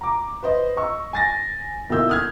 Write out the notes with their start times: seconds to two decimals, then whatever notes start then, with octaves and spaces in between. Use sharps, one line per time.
0.01 A#5 D6
0.43 B4 C5 D#5
0.77 D#5 C#6 E6
1.13 G#5 A6 A#6
1.90 B1 D#3 A#3 E4 E6 G6
2.09 D#6 F6 G#6